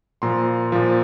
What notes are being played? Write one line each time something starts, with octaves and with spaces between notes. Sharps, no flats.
A#2 F3 A#5 C6
A#2 F3